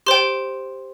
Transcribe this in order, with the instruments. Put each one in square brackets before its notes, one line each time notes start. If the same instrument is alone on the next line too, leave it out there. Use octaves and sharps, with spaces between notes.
[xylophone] G4 C5 G5 C6